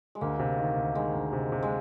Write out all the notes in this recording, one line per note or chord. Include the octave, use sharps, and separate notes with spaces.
G#3
D2 A#3
C3
D#3
D2
D#3 G#3
D2
C3
C3
G#3